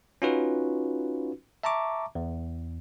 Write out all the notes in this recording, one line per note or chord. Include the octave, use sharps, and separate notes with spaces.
C#4 D#4 F4 F#4 B4
E5 A5 A#5 C#6 D6
E2